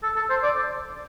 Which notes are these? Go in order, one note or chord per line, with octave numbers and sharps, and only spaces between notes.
A4
A4
C5
D5